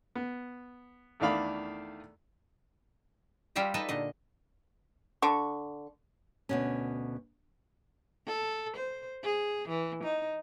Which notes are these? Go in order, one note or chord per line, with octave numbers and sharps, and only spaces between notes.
B3
E2 D#3 A3 D4 F5 B5
G3 F4 G4 E5 A#5
D#4 A4 B4 D#5 E5
A#2 D3 D#5
D3 C#6
D2 B2 C#4
A4
C5
G#4
E3
D#4